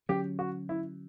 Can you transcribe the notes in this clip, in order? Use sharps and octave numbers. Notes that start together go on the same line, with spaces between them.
D3 F#3 C#4 G4
F#4
E4